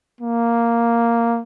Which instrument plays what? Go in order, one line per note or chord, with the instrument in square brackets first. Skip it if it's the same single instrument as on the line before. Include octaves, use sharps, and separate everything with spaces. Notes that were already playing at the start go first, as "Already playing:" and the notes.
[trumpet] A#3